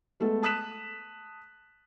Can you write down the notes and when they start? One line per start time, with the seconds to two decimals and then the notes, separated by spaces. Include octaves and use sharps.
0.20 G#3 A3 B3 A4
0.42 A5 D#6 F#6 B6 E7